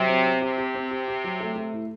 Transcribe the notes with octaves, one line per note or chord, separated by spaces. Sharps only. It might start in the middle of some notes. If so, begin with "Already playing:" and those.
Already playing: C3 F#3
C4
C4
C3 G4
G4
C4
G4
G4
F#3
A3
A3
A2